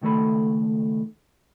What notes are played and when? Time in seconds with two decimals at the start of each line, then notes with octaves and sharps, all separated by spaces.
0.02 C#2 D#3 A3 A4 B5